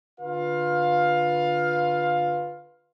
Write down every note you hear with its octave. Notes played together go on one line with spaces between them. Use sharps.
D3 F4 B4 F5